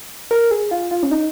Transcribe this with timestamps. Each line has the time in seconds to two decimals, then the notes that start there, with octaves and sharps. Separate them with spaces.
0.31 A#4
0.51 G#4
0.71 F4
0.91 F4
1.03 C#4
1.11 D#4